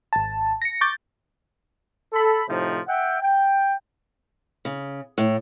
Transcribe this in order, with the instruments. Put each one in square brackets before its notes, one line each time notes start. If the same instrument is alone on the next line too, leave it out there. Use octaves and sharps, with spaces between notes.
[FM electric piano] G#1 A5
A#6 C#7
C#6 D6 G6 A6
[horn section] A4 B5
A2 C3 F3 D#4
E5 F#5 G5
G5
[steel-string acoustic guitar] C#3
A2